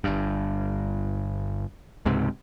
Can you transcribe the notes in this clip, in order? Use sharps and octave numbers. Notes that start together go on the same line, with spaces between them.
G1 G2
C#2 G#2 C3